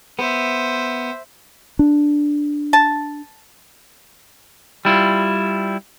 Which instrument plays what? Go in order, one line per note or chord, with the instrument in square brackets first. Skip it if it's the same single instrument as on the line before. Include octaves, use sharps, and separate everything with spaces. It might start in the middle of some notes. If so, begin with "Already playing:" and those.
[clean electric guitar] B3 [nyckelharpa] C5 E5
[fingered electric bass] D4
[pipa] A5
[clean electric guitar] G3 E4 F4